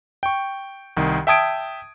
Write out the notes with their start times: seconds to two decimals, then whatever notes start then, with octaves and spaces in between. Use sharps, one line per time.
0.23 G5 C#6
0.97 C2 D#3
1.27 E5 G5 A5 D#6 G#6 D7